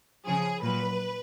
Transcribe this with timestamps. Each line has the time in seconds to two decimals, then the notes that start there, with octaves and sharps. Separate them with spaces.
0.26 C#3 F3 G#4
0.63 A#2 F#3 B4